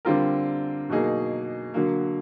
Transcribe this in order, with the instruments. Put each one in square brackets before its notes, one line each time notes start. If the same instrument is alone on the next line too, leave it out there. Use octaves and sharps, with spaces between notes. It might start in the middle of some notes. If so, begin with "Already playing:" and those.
[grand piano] D3 G3 C4 F4 A#4
B2 F#3 A#3 D#4 G#4
D3 F#3 A#3